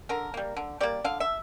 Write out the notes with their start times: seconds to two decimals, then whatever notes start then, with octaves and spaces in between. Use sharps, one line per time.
0.09 D3 A#4
0.34 G3 A#3
0.56 D3
0.80 G3 A#3 D5
1.04 D3 F5
1.20 E5